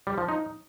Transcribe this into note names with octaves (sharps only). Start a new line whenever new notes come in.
G3
F3
D#4